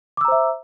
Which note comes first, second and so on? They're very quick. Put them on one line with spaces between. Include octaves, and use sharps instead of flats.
D6 E6 A#5 C5 E5